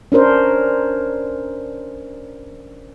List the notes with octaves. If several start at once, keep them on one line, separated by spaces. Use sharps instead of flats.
C#4 D4 A#4 C5